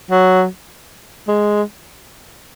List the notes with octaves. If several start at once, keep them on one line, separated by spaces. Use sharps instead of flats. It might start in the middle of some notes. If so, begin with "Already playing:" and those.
F#3
G#3